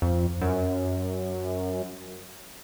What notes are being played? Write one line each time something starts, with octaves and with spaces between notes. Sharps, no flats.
F2
F#2